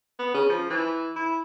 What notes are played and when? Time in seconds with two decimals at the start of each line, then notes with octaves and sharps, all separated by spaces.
0.19 B3
0.34 C#3
0.50 F3
0.70 E3
1.16 E4